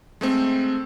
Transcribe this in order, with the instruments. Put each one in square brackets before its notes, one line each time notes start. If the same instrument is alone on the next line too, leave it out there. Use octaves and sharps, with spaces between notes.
[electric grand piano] G#3 A3 C4